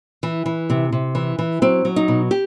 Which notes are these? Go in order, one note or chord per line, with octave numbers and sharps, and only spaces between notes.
E3
E3
C3
C3
E3
E3
F#3 C4
F#3
D#4
B2
G4